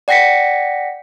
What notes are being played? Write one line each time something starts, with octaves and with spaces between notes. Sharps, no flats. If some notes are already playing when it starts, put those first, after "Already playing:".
D5 F#5 G5 A#6 B6 C#7